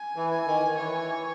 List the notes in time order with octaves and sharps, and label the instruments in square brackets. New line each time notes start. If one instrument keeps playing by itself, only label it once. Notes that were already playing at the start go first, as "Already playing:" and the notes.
Already playing: [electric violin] G#5
[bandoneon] E3
[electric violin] G#5
[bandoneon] D#3
D#3
[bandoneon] E3 [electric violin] C#5